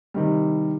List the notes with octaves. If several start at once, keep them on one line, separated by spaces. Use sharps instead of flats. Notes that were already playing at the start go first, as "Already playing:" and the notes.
C3 D#3 G3